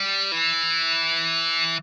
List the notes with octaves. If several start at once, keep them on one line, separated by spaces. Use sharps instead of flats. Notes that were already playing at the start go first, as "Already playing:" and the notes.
Already playing: G3
E3